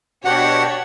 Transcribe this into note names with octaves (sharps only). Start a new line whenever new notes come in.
B2 D4 F#4 G4 C#5 F#5